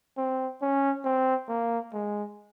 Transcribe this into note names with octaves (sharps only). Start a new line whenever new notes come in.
C4
C#4
C4
A#3
G#3